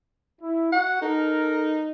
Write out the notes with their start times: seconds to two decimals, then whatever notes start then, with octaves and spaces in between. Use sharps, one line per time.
0.41 E4
0.72 F#4 F#5
1.02 D#4 A4 A#4